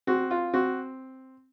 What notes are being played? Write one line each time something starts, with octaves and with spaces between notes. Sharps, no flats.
C4 F#4
F4
C4 F#4